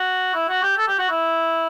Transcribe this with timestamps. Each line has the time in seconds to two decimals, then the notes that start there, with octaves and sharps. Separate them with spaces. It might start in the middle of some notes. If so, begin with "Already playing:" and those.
Already playing: F#4
0.35 E4
0.49 F#4
0.63 G4
0.78 A4
0.88 G4
0.99 F#4
1.10 E4